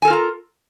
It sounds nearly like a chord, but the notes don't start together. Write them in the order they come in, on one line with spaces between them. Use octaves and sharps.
G#5 A4 A#4 F4 A#5